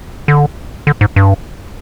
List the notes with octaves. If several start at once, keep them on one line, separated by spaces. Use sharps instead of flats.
D3
D3
G#2
G2